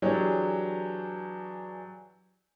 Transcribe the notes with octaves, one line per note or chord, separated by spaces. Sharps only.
E3 F#3 D4 G4 G#4 C#5